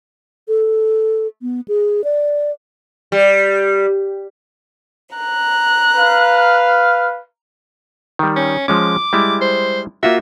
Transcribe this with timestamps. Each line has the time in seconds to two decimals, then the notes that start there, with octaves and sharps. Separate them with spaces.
0.48 A4
1.42 B3
1.68 G#4
2.04 D5
3.12 G3
5.16 A#5 F#6
5.96 B4 F5
8.19 D#3 G3
8.36 C#4
8.68 F3 G#3 C#4 D6
9.13 G3 G#3 E4
9.41 C5
10.03 A#3 F4 F#4 E5